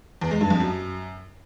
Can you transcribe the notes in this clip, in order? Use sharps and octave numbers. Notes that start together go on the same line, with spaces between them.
E2
G#3
G2
F2
F#2